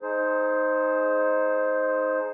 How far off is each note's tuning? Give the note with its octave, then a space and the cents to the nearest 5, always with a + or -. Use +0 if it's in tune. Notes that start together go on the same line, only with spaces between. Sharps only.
D#4 +0 G#4 +30 C5 +0